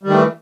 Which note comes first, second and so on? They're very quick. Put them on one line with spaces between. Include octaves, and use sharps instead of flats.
G3 D#3 A3 E3